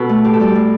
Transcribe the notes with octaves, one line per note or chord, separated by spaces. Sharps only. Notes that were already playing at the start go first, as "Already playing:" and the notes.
Already playing: B2 A4 B4
A3
A2 G4
A4
G3 G4
A2